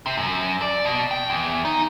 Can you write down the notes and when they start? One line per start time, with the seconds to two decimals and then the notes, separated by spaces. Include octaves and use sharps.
0.06 C3
0.18 F#2
0.62 D5
0.85 B2
1.11 G5
1.30 E2
1.65 D#4